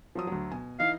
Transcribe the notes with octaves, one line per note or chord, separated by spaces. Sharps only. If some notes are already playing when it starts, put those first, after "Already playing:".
F3 F#3 D#6
D2 F#3
B2 G#5
E3 D#4 F5